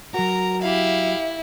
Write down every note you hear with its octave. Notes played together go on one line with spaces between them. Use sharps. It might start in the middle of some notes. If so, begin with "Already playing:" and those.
F#3 F#4 A#4 A#5
E4 G4 F5